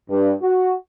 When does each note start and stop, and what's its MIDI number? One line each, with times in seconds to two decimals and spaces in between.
0.10 0.32 43
0.42 0.73 66